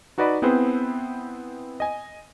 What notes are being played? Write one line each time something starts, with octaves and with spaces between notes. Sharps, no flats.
D#4 F#4 B4 D5 D#5 B5
B3 C4 E4 G#4 B4 C5
D#5 G#5